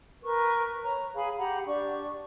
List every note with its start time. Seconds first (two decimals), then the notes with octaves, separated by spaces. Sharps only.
0.23 A#4 B4 C#6
0.82 B4 C#5 A#5
1.16 G#4 F5 G#5 B5
1.37 G4 F#5 A#5 B5
1.66 D4 G4 C#6